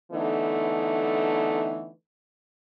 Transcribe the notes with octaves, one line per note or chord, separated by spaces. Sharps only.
D3 E3 A3 B3 D#4